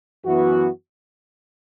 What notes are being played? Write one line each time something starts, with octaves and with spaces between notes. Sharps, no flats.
F#2 E3 B3 F#4